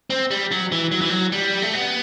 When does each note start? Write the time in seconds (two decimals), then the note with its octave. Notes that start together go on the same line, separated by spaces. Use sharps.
0.10 C4
0.31 G3
0.51 F#3
0.72 E3
0.92 F#3
1.01 E3
1.10 F#3
1.32 G3
1.62 A3
1.74 B3